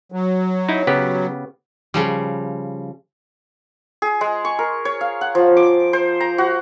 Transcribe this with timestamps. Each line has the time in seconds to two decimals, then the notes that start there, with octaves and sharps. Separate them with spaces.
0.12 F#3
0.69 D#4 E4
0.87 C#3 B3 G4
1.94 C#3 F3 G3
4.02 G#4
4.21 G#3
4.45 C#6
4.59 A#4
4.85 C#5
5.01 F5
5.21 F#5
5.35 F3
5.57 D6
5.93 C5
6.20 A#5
6.38 F#4